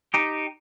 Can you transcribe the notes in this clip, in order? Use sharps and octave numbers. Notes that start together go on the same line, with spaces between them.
D#4 G4